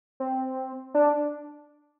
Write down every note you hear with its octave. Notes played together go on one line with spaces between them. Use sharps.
C4
D4